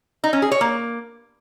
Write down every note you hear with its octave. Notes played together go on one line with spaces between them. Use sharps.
D#4
C#4
G#4
C#5
A#3